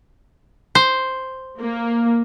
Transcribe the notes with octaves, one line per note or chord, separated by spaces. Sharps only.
C5
A#3